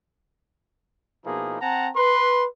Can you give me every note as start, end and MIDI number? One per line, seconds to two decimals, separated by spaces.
1.25 1.57 47
1.25 1.57 53
1.25 1.57 58
1.25 1.57 63
1.25 1.57 64
1.25 1.57 68
1.61 1.89 60
1.61 1.89 78
1.61 1.89 79
1.61 1.89 81
1.61 1.89 82
1.95 2.45 71
1.95 2.45 84